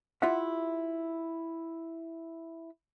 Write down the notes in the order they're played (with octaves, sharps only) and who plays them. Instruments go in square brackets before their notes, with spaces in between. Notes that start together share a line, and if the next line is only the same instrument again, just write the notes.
[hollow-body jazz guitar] E4 F4 G4 E5 F#5